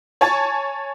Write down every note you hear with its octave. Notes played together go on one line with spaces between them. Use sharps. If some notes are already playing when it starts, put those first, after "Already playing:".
C#5 G#5 A5 C#6 G#6 A6